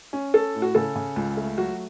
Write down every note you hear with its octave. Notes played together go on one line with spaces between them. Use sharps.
C#4
C#4 A4
A2
F#4
C#3 A4
C#3
C#2
A3
F#3 F#4